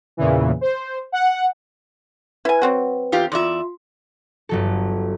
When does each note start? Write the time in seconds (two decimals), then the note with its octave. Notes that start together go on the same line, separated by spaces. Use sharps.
0.17 E2 A#2 C#3 E3
0.61 C5
1.12 F#5
2.45 E4 B4 G#5
2.62 F#3 C4 F#4
3.12 E2 F4 G4
3.32 E2 F4 D5 E5 C6
4.49 G1 F#3 A4